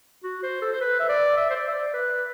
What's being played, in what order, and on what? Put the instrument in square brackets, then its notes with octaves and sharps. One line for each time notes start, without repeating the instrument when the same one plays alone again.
[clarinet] F#4
C5
A4
C5
B4
E5
D5
E5
C5
D5
E5
D5
B4